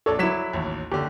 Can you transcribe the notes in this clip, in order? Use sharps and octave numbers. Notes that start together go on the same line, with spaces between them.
A#1 D4 A4 C#5
F#3 E4 D6 B6 E7
A1 D#2
F#1 D3 G4